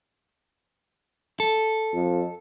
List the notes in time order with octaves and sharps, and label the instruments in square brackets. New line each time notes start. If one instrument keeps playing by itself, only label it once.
[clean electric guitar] A4
[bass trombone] F2